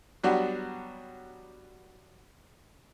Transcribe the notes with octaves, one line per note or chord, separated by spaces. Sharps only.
F#3 G3 B3 D4 F#4